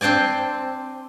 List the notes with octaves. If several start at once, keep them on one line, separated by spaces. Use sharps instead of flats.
C4 D4 C5 D5 G#5